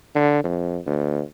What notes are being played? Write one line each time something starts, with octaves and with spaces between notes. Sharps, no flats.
D3
F2
D2